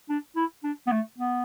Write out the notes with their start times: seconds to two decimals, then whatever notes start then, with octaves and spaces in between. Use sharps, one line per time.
0.09 D4
0.36 E4
0.63 D4
0.87 B3
0.92 A3
1.18 B3